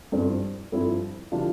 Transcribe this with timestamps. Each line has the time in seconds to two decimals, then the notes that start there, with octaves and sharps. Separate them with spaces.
0.12 G2 F3 C4 E4
0.72 G2 F3 C4 E4
1.32 E3 G3 D4 F4